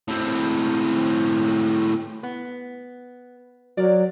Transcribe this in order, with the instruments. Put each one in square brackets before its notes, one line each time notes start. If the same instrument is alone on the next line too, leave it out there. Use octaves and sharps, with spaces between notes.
[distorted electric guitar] A2 C4
[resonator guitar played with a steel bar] B3
[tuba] F#3 [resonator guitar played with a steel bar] A#4 D5